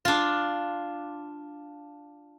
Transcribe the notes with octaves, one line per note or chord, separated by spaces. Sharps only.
D4 F4